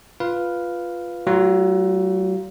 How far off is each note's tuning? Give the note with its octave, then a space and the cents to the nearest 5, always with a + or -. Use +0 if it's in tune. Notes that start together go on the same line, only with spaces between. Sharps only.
F4 +0 B4 +0 F5 +0
F#3 +35 A3 +0 F4 +0